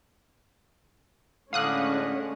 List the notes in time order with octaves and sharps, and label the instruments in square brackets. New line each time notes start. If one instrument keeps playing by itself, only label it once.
[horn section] A2 D3 [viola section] G#3 C#4 [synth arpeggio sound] F5 D#6 F#6